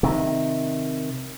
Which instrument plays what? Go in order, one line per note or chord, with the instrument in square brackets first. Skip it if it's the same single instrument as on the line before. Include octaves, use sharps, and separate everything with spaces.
[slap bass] C3 D#3